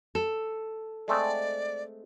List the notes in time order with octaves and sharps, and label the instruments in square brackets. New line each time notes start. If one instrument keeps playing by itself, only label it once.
[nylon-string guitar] A4
[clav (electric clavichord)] G#3 A3 C4 [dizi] D5